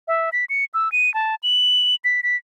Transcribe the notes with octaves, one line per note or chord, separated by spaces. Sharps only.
E5
B6
C#7
E6
D#7
A5
F#7
B6
B6